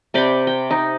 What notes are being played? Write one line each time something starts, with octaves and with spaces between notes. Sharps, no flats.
C3 D5 G5 B5
G5
D#4